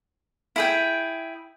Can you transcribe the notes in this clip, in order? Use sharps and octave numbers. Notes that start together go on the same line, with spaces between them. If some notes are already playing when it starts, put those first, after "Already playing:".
E4 G#4 G5